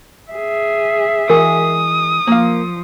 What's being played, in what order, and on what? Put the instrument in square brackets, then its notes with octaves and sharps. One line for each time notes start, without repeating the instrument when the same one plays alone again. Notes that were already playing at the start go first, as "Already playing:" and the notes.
[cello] G#4 E5
[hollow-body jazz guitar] E3 G#3 F#4 [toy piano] A#4 [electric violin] D#6
[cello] F3 [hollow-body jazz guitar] A#3 F5